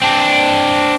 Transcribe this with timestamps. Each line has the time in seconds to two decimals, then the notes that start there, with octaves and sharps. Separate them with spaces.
0.02 C4 D4